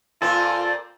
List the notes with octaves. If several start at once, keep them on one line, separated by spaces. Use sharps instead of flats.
A#2 C4 F4 A4